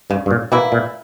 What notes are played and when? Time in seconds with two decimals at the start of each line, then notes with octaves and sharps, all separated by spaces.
0.10 G2 C#3
0.26 G2
0.31 A#2
0.52 B2 E3 A#3 E4
0.72 A#2